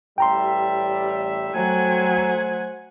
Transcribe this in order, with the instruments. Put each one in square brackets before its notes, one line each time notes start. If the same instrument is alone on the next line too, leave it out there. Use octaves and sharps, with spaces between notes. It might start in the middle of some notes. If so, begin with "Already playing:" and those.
[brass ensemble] A1 G3 E5 [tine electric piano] G5 A#5 C6
[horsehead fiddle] F#3 G#5 [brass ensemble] A3 C5 F#5